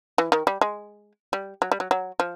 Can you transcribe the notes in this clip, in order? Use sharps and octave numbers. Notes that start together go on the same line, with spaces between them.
E3
D#3
G3
G#3
G3
F#3
G3
F#3
F#3
F3